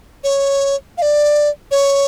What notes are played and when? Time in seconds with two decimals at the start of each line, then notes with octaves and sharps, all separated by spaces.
0.24 C#5
0.98 F5
1.02 D5
1.71 C#5